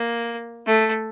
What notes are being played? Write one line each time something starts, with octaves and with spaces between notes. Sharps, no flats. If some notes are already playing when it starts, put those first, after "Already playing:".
Already playing: A#3
A3